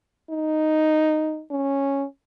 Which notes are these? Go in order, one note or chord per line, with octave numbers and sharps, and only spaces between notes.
D#4
C#4